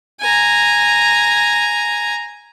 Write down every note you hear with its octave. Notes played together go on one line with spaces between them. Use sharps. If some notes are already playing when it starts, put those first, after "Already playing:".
G#5 A#5